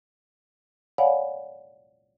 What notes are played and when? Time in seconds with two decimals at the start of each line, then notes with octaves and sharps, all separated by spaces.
0.98 C#5 D5 F5 F#5 G#5 B5